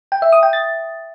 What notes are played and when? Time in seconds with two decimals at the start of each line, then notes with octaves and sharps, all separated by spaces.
0.12 G5
0.22 E5
0.32 D#6
0.43 G5
0.53 A6